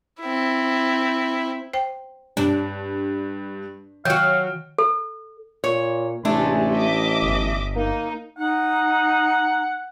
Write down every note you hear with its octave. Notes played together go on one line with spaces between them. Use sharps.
C4 E4
C5 G5
G2 D4
D#3 F#3 F#4 F5 G5
A4
A#2 C#5
A1 C3 G#3 A3 D4 E4
D#5 E5 D6
G1
A#3 D#4
D#4 F#5